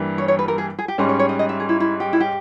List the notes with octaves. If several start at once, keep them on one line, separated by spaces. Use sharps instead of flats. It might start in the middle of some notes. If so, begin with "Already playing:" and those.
Already playing: G2 E3 G3 A#3
C#5
C#5
B4
A#4
G#4
G#4
G4
G#2 G3 C#4 D#5
C#5
C#5
D#5
D#5
E5
G#4
E4
E4
G4
E4
G4